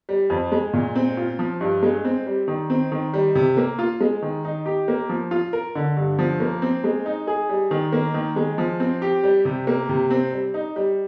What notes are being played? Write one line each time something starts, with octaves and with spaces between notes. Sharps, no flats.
G3
F2
G#3
A#2
C4
F4
F3
G2
G#3
C4
G3
D#3
C4
D#3
G3
C3
A#3
F4
G#3
D#3
D#4
G4
A#3
F3
F4
A#4
D3
G2
F3
A#3
C4
G#3
D#4
G#4
G3
D#3
A#3
D#3
G#3
F3
C4
G4
G3
C3
A#3
C3
C4
G3
D#4
G3